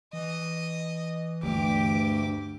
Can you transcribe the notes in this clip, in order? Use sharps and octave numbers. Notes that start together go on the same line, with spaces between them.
E3 D#5
D2 G2 G#3 A3 G4 D6